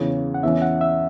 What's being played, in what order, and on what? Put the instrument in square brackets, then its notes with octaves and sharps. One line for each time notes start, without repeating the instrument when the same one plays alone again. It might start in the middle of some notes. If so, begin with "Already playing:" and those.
Already playing: [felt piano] E2 C#3 E3 [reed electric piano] C#5
[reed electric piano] F#5
[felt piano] E2 E3 C#4 [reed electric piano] E5
[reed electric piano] F#5
E5